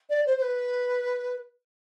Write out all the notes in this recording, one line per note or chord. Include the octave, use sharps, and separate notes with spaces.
D5
C5
C5
B4